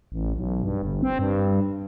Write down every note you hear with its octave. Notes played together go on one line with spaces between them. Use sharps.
A1
B1
G2
G1
C4
G2